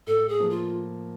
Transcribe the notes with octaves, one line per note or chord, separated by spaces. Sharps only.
A2 A4
G#4
F3 A#3
F4